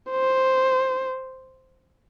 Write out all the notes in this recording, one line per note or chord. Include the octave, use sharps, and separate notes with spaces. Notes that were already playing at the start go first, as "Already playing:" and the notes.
C5